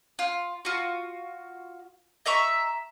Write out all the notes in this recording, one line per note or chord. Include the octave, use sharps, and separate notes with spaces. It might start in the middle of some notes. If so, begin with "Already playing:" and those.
F4
F4 F#4
D#5 E5 A#5 C#6